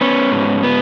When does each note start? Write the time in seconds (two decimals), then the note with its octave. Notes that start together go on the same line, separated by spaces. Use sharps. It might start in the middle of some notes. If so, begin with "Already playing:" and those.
0.01 B3 C#4
0.32 G#2
0.63 B3